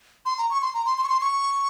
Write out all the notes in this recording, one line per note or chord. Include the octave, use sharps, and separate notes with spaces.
C6
A#5
C#6
C6
A#5
C6
C6
C#6
C6
C#6